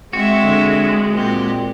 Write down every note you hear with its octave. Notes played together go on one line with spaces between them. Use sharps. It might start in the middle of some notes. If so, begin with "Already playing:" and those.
G#3 C4 F#4 E5
D3
A#2 C4 G4